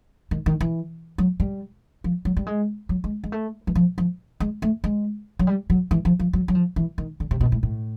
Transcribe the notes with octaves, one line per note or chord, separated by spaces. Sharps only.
D#3
D#3
E3
F#3
G3
F3
F#3
G3
G#3
F#3
G#3
G#3
A3
E3
F3
F3
G#3
A3
G#3
F#3
G3
F#3
E3
F3
F3
F#3
F#3
F3
E3
D#3
D3
C3
B2
A2
A2